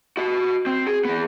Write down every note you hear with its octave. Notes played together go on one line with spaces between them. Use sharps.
F#4 D#5
C4
G#4
E3 B3